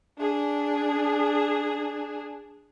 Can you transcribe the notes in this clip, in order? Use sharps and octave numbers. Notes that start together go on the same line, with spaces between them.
D4 G#4